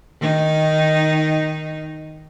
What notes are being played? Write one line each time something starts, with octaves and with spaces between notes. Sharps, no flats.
D#3 D#4